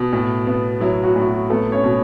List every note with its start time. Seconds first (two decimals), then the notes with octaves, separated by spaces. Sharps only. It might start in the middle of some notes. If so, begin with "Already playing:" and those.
Already playing: B2
0.13 A2
0.47 B3
0.81 F#3 E4
1.03 F#4
1.16 A2
1.22 E4
1.27 F#4
1.50 A3 B3 A4
1.72 C#4 C#5
1.84 B2